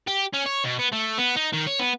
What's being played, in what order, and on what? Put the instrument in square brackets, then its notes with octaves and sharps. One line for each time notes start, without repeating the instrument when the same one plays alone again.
[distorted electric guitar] G4
C#4
C#5
B2
B3
A3
B3
D#4
D#3
C#5
B3